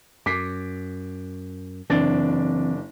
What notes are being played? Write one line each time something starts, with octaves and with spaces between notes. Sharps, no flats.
F#2 D6 B6 C7
F#1 E3 C4 D4 A6